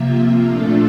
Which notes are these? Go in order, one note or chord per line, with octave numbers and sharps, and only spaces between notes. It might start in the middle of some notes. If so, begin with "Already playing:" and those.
Already playing: C3 F3 A#3 F4 E5
A#2 F3 A3 D4 F4 A4